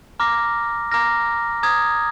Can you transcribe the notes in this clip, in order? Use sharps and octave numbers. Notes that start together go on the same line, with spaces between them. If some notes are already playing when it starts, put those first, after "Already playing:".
A#5 D6 F6 A#6
A#5 D6 F6 A#6
A#5 D#6 G#6